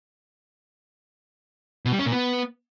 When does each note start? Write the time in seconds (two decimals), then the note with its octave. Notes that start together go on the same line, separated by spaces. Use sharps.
1.85 B2
1.92 G3
1.99 C#4
2.06 A#2
2.12 B3